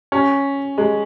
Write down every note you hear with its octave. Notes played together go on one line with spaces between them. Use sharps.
C#4
G#3